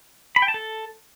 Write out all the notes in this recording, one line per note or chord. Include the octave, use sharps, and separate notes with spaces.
B5
G5
A5
A4